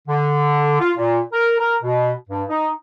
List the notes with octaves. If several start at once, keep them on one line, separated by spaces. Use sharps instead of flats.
D3
F4
A#2
A#4
A#4
B2
G2
D#4